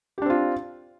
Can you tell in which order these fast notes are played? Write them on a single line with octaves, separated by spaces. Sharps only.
G4 D4 C4 F4